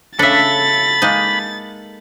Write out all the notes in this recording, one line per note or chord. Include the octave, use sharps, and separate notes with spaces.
C#3 D4 A4 E5 B5 A6
G#3 A#3 D#4